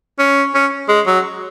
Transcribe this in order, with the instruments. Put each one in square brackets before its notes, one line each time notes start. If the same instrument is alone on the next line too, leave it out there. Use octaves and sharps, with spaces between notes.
[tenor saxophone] C#4
C#4
G#3
F#3